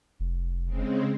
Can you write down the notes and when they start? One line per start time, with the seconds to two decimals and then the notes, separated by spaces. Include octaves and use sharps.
0.20 F1
0.65 C#3 G#3 C4